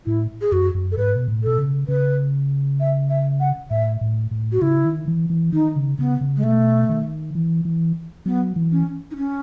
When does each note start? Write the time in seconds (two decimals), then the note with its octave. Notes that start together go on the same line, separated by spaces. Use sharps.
0.06 A2 E4
0.41 G#4
0.52 F#2 F#4
0.75 F#2
0.92 A4
0.97 G#2 B4
1.16 B2
1.28 A2
1.43 B2 A4
1.58 C#3
1.88 C#3 B4
2.80 E5
3.10 E5
3.40 F#5
3.71 A2 E5
4.01 A2
4.31 A2
4.52 F#4
4.62 C#3 E4
4.85 D#3
5.08 E3
5.30 E3
5.52 D#3 D#4
5.76 C#3
5.99 C#3 B3
6.21 C#3
6.37 G#3
6.43 B2 A3
6.89 D#3
7.35 E3
7.65 E3
8.26 F#3 B3
8.56 E3
8.72 C#4
9.11 D#4
9.17 C#4